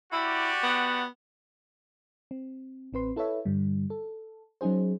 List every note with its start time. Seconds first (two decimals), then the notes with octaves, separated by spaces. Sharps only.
0.12 E4 F#4 G4 D5
0.63 B3
2.31 C4
2.93 A1 C4 B4 C6
3.16 E4 A4 B4 C#5 E5
3.45 G2 D3 G3
3.90 A4
4.61 F#3 C#4 D#4 G#4 C5